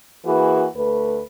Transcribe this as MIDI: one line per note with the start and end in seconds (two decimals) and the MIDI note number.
0.25 0.66 52
0.25 0.66 58
0.25 0.66 66
0.25 0.66 68
0.25 0.66 71
0.76 1.21 38
0.76 1.21 57
0.76 1.21 71